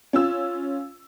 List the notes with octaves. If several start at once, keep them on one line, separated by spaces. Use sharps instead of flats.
C#4 F4 E6